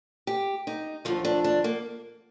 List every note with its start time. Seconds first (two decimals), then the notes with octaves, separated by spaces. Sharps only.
0.27 G4
0.67 D#4
1.05 D#2 D3 F3 F4
1.25 D4
1.44 D4
1.64 A#3